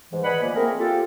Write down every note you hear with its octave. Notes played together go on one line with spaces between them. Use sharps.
G#2 E3
B4 D5 D#5 F#5 G#5 B5
F3 A#3
A3 C4 G#4 A#4
F4 G4 A4